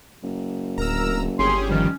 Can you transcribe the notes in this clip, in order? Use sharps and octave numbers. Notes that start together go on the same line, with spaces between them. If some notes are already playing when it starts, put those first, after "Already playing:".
F#1
D1 A#4 A#5 E6
G1 C#4 G4 G#4 C6
D#3 F3 G3 C#4